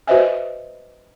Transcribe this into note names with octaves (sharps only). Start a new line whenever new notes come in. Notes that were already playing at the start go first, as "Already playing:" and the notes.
F#4 B4 C5 D#5 E5 G#5